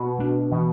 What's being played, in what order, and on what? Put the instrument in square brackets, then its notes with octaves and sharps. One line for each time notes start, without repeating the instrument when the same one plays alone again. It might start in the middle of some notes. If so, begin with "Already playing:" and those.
Already playing: [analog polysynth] B2
[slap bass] A3 D4
[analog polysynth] B2 [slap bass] E3